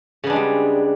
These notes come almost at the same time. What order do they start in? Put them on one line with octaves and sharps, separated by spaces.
C#3 B3 D4 G#3 G3